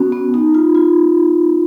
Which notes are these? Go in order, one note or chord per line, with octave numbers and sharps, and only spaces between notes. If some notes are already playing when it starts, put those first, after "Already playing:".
Already playing: B3 C#4 F#4
B3
D#4
F4
F4